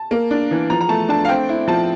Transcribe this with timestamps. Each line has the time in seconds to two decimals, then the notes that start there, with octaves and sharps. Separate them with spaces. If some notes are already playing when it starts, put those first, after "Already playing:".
Already playing: A5
0.11 A#3
0.31 D4
0.51 E3
0.70 F3 A#5
0.81 A#5
0.89 A3 A5
1.09 D4 A5
1.25 F5
1.28 C4 G5
1.49 E4
1.68 F3 A5